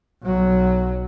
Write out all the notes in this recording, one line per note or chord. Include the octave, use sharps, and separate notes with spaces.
B1 F#3